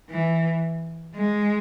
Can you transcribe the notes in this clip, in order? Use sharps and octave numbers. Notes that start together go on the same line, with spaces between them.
E3
G#3